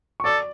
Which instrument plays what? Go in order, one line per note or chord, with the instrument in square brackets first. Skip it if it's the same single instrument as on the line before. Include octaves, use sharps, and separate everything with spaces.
[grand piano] C#6
[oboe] A4 [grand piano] D5 D6